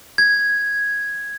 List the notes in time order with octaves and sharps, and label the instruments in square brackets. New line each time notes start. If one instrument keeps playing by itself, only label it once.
[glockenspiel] G#6